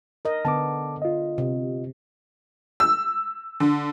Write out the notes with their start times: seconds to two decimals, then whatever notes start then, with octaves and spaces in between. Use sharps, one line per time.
0.25 A#4 D#5
0.45 D3 B3 A5 D6
1.02 F4 D#5
1.38 C3
2.80 E6
3.60 D3